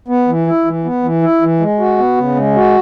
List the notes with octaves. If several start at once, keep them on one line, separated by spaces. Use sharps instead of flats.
B3
E3
E4
E3
B3
E3
E4
E3
G#3
F#4
B3
C#3
G#3
F#4